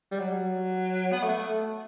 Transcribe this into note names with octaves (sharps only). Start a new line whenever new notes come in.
G3
F#3
B3
A3